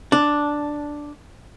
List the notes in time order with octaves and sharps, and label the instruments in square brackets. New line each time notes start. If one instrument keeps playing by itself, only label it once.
[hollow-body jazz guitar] D4